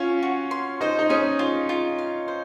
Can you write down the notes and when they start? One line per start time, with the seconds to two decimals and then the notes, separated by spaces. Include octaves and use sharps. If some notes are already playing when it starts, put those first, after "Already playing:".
Already playing: C#4 F4 C#5 F#5
0.23 F#4
0.51 C6
0.81 D#4 C5
0.99 D#4
1.10 C#4 G#4
1.39 F4
1.69 F4
1.98 F5
2.28 C5